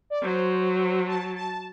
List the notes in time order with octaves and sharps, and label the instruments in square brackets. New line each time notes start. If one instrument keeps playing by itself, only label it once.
[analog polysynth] D5
[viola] F#3 [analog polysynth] C5
[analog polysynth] A5
A5